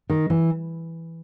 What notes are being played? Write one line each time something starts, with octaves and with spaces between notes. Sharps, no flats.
D#3
E3